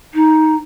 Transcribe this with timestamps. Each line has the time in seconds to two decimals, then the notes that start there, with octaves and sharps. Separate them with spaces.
0.14 D#4